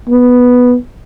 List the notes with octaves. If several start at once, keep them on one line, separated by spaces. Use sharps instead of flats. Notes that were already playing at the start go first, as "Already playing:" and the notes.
B3